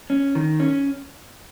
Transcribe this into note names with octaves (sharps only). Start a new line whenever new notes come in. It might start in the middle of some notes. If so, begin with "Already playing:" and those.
C#4
D#3
C#4